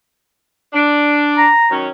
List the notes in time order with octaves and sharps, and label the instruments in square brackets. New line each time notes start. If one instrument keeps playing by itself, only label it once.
[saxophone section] D4
[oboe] A#5
[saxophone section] D#3 F#3 C#4